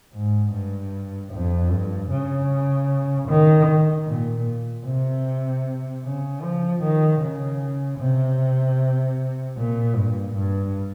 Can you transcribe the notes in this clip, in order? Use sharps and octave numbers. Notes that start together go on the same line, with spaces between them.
G#2
G2
F2
G2
C#3
D#3
A#2
C3
C#3
F3
D#3
C#3
C3
A#2
G2
G2